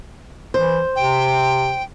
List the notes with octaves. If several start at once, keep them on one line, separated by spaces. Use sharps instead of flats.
E3 C5
C3 G5